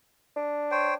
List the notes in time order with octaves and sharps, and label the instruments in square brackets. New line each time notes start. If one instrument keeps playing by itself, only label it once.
[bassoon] D4
[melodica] C5 C#5 G5